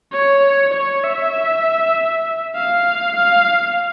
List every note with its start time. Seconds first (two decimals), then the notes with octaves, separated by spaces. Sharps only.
0.12 C#5
0.74 C#5
1.04 E5
2.55 F5
3.16 F5